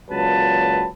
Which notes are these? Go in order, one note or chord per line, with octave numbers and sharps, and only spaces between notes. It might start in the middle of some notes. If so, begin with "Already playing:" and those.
C#2 A#2 F#3 B4 A5